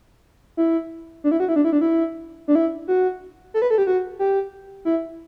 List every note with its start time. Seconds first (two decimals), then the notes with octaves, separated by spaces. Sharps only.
0.57 E4
1.24 D4
1.31 E4
1.40 F#4
1.49 E4
1.56 D4
1.65 E4
1.73 D4
1.81 E4
2.48 D4
2.55 E4
2.88 F#4
3.54 A4
3.62 B4
3.71 A4
3.78 G4
3.87 F#4
4.19 G4
4.85 E4